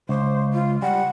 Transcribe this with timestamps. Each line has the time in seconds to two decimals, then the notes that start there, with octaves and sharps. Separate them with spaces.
0.09 C#2 C5
0.53 F4
0.82 G3 F#5